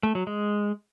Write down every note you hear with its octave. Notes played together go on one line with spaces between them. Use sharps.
A3
F#3
G#3